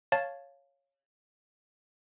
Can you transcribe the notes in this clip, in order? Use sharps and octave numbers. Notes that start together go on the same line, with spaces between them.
C#5 F5 A5 A6